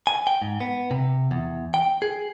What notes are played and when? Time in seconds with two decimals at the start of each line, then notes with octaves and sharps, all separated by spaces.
0.07 G#5
0.27 G5
0.42 G#2
0.61 B3
0.91 C3
1.31 E2
1.74 G5
2.02 G#4